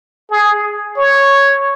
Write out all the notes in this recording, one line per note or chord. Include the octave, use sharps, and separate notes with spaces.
G#4
C#5